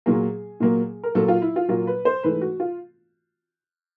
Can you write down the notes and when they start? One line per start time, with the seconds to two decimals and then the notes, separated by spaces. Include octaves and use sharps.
0.06 A#2 F#3 A#3 G#4
0.60 A#2 F#3 A#3
1.04 A#4
1.15 A#2 F#3 A#3 A4
1.28 F4
1.42 E4
1.56 F4
1.69 A#2 F#3 A#3 F4
1.87 B4
2.05 C5
2.23 G#2 E3 A3 B4
2.41 F#4
2.60 F4